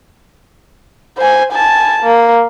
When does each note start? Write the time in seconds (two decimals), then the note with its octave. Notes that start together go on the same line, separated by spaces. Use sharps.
1.18 C5 G#5
1.53 G#5 A5
2.03 A#3